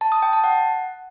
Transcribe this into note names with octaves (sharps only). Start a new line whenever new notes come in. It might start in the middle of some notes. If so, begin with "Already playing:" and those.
A5
D#6
G5
A5
F#5